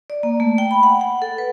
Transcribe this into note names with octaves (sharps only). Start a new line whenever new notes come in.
D5
A#3
A3
G5
B5
F#5
F#5
A4
B4